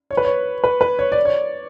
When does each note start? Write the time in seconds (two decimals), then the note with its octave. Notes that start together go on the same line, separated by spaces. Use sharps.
0.11 C#5
0.17 B4
0.25 C#5
0.64 B4
0.81 B4
0.99 C#5
1.12 D5
1.25 C#5